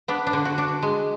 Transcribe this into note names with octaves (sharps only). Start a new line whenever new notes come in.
B3 D4
D4
D3
F#4
D4
G#3